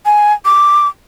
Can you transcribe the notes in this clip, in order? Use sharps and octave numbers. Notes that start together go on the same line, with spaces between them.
G#5
D6